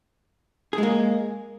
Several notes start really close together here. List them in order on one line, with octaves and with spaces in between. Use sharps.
G#4 G#3 A#3